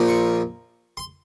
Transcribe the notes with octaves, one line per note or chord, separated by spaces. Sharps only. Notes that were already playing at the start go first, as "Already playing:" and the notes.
Already playing: A#1 A#2 F3 A#3
C#6
C6